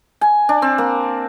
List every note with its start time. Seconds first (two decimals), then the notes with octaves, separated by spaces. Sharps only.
0.21 G#5
0.49 D4
0.62 C4
0.78 A#3